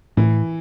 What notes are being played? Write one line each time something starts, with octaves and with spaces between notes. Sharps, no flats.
A2 E3